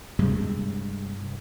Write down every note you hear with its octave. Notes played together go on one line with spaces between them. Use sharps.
G2 C3 G#3